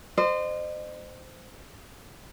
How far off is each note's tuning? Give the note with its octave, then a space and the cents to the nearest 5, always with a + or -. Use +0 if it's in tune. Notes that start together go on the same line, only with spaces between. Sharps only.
C5 -15 D#5 -40